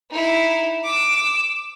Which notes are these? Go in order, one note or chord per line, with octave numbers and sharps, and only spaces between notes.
D#4 E4
D6 E6